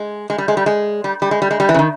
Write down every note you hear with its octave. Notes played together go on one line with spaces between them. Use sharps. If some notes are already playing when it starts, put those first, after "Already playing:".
Already playing: G#3
G#3
G3
G#3
G3
G#3
G3
G3
G#3
G3
G#3
G3
E3
C#3
D#3